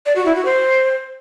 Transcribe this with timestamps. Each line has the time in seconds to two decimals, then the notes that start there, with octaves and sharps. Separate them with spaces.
0.06 D5
0.16 F#4
0.26 E4
0.35 F#4
0.45 C5